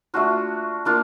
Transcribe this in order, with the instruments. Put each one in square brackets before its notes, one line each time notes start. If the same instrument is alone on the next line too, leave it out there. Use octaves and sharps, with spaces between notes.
[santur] A3 D4 F4 F#4
A#3 D4 F4